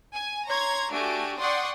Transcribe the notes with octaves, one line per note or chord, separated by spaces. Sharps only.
G#5
C#5 A#5 C6 G#6
A3 D4 F#4 G4 G#5 D7
D5 F#5 G5 C6 C#6 D#6